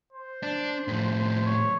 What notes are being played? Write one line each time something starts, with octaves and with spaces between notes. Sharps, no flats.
C5
D4
A2 F3
C#5